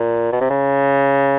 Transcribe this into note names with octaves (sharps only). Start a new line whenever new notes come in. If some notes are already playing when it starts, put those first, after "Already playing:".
Already playing: A#2
B2
C3
C#3